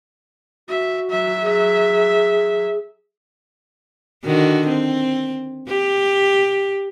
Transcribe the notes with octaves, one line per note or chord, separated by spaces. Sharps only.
F#4 E5
F#3 E5
G#4
D3 D#3 F#4
C4
G4